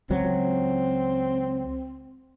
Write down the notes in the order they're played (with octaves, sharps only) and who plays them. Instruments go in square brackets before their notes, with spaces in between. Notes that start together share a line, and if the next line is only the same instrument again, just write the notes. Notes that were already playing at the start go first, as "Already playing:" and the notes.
[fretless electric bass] C#2 F#3 [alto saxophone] C4